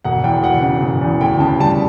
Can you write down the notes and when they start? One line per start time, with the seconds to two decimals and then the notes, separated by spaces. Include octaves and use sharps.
0.05 E1 F#5
0.24 E2 G5
0.43 E1 F#5
0.62 C#3
0.82 E1
1.01 E2
1.21 D2 G5
1.40 C#3 A5
1.59 G3 A5